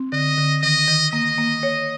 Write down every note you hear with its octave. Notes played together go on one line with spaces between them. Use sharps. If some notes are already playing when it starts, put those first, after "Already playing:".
Already playing: C4
D3 D#5
D3
D#3 D#5
D#3
A#3 D#5
A#3
C#5